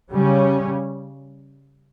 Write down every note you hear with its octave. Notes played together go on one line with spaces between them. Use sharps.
C#3 G3 C#4